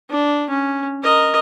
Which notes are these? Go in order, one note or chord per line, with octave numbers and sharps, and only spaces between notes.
D4
C#4
A#4 D#5